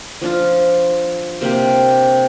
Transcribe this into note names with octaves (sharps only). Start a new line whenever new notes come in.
F3 D4 F4
C3 A#3 D4 G4